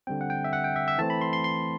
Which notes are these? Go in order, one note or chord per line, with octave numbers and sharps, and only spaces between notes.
D3 G3 C4 G5
F#5
G5
E5
F#5
G5
E5
E5
E3 A3 C4 A5
B5
C6
C6
C6